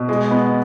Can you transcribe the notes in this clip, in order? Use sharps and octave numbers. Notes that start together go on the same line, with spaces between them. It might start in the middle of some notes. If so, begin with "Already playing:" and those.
Already playing: B2
G#3
B3